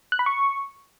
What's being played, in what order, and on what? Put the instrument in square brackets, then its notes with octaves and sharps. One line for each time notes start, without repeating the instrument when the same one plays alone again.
[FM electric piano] F#6
B5
C#6